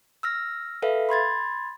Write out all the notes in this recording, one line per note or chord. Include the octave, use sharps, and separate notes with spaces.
E6 F6 A#6
A4 B4 E5 F5
B5 C6 G#6 A6